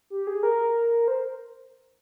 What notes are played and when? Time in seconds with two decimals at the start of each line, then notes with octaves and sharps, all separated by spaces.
0.10 G4
0.27 G#4
0.43 A#4
1.08 C5